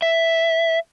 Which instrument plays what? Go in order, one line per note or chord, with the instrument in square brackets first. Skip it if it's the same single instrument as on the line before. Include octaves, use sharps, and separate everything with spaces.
[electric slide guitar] E5